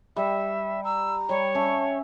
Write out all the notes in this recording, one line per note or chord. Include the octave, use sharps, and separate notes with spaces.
G3 E5
A#5 E6
G3 C#5
C#4 E5 A5